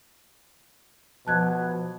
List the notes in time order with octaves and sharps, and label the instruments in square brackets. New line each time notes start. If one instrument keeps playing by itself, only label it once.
[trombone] B2 [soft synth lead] F3 [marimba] A5 F#6 G#6